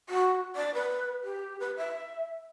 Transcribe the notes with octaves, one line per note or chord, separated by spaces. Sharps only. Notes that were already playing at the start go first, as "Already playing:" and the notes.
F#4
D5
B4
G4
B4
E5